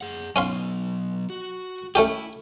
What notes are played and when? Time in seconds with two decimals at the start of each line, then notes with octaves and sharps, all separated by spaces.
0.01 G#4 F#5
0.36 F#3 B3 C#4 F5 C6
1.30 F#4
1.95 A3 C#4 E4 G4